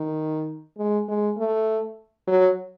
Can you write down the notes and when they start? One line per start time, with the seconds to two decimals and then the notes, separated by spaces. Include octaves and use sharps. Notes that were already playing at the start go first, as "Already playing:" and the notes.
Already playing: D#3
0.78 G#3
1.08 G#3
1.38 A3
2.27 F#3